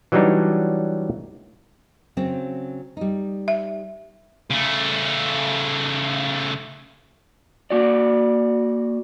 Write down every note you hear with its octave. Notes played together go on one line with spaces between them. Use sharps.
E3 F#3 G3 D4 D#4 C#5
C#3 F#3 C4
G3 D#4
E5
C#3 A3
A#3 F#4 D5